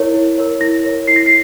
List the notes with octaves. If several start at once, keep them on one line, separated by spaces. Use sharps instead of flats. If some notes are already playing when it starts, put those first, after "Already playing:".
Already playing: E4 A#4 C#5
E4
A#4 C#5
E4 A#6
A#4 C#5
E4 C7
A#6
C7